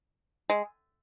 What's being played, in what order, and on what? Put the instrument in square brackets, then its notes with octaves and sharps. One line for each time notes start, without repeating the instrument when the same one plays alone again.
[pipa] G#3